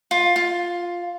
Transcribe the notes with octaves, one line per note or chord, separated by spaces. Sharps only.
F4
F4